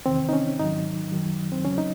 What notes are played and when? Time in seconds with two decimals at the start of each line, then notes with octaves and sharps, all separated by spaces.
0.06 E2 C3 D#3 C4
0.29 D#4
0.33 C#4
0.59 G#2 D#3 F#3 D#4
1.12 F#2 D#3 F#3
1.52 C4
1.65 E2 C#3 F#3 C#4
1.78 D#4